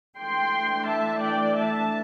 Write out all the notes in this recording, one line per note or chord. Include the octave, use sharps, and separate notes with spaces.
E3 A3 D4 G5 C6
E5 A5
D5 G5
E5 A5